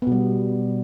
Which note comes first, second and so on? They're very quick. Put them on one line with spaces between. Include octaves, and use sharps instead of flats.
B3 B2 G3